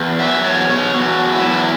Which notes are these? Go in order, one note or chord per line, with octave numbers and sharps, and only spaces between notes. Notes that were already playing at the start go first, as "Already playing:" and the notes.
Already playing: E2
F#3 E5
E2 C#5
B2 C#5
E2 F#4
F#3
E4
E2